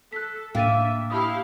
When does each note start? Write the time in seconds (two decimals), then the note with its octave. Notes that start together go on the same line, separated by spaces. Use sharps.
0.13 A4 F#6 B6
0.55 A2 A#3 D4 E5 G5 A6 D#7
1.10 E4 G4 F5 A5 B5 D#6